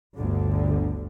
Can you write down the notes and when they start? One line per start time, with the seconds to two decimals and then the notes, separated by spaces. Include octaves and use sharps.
0.16 G1 D2 D3